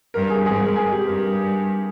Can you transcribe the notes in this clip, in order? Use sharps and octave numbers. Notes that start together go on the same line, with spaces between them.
G2 A#4
G#4
G#2 G#4
A#4
G#4
G4
G2 A#4